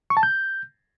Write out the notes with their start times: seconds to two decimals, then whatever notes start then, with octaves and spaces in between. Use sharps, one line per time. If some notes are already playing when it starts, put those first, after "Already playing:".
0.10 C#6
0.17 A5
0.23 G6